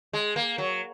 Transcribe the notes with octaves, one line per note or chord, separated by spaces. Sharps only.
G#3
A#3
F#3